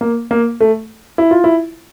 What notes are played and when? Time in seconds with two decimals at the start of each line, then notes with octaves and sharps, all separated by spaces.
0.01 A#3
0.31 A#3
0.61 A3
1.18 E4
1.31 F4
1.44 E4